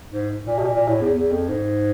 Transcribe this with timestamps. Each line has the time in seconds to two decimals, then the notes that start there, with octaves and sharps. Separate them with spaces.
0.12 G#2
0.46 A#2
0.59 B2
0.63 A#2
0.75 A#2
0.88 A2
1.01 E2
1.14 E2
1.31 F2
1.49 G#2